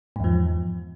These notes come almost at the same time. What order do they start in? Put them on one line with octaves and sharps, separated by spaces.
G#2 E2 F3